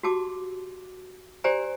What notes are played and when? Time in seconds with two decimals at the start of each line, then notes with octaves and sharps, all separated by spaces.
0.03 F#4 G4 A5 D6
1.44 G4 C5 D5 G#5 A#5